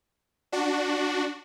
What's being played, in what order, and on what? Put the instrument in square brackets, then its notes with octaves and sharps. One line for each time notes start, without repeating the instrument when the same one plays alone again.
[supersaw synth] D4 F#4